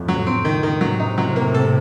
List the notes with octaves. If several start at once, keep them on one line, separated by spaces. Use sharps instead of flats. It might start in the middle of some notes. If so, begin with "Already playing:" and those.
Already playing: F2 A2
F#3
C4
D#3
D#3
A2 C3 F#3
D#4
F#3
A#3
A4